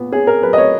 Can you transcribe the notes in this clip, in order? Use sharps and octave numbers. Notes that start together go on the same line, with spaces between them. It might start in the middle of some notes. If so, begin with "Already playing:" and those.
Already playing: A#2 B3
C#4 G#4
A#4
F#3 B4
D#5
C#5